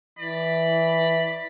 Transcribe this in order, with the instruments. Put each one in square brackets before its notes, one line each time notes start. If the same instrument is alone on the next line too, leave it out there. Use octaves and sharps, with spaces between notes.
[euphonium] E3 [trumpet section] D5 B5